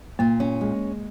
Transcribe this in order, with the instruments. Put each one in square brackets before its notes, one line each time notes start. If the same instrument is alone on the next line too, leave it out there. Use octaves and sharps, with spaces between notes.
[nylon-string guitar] A#2 [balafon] A#3
[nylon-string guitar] C#4
G#3